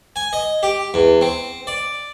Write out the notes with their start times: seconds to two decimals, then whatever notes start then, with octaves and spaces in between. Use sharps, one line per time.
0.16 G#5
0.33 D#5
0.63 G4
0.94 E2
1.21 C4
1.67 D5